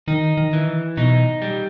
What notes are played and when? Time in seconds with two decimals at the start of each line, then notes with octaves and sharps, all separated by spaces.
0.08 D#3 D#4
0.37 D#3
0.53 E3
0.97 B2 D#4
1.42 G3